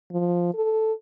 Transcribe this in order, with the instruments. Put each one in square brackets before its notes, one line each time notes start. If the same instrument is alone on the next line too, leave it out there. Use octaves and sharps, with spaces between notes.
[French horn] F3
A4